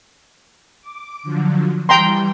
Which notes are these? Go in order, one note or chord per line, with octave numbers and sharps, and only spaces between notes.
D6
D3 F3 F#3
E3 G3 G5 A#5 C6